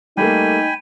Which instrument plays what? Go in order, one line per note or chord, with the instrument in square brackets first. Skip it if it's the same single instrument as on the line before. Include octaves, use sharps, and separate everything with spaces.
[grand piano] G3 A3 A#3 [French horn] D#4 [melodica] G5 G#5 B5 [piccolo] D#7